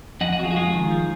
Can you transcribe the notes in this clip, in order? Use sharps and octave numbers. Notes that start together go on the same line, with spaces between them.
F2 D#5 F#5
D#5 F#5
F2 F#4
F4 G#4
F#4
G#3 F4 G#4
D#3
F3